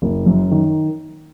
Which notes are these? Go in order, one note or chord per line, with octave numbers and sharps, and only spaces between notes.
F#1
F#2
D#3